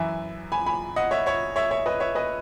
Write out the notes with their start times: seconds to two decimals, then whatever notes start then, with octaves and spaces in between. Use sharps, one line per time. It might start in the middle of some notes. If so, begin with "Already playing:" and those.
Already playing: F#2 E3 E5 G#5
0.52 G#5 B5
0.66 G#5 B5
0.96 D#5 F#5
1.11 C#5 E5
1.26 C#5 E5
1.56 C#5 E5
1.71 C#5 E5
1.86 B4 D#5
2.00 C#5 E5
2.15 B4 D#5